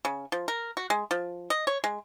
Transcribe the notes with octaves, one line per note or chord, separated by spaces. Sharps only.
C#3
F3
A#4
F#4
G#3
F3
D#5
C#5
G#3